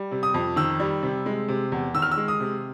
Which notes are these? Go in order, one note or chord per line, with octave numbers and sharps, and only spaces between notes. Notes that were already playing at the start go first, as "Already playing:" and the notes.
Already playing: G3
C3
D#6
F2
D#3 E6
G3
C3
G#3
C3
E2
D#3 E6
F6
E6
G#3
D#6
C3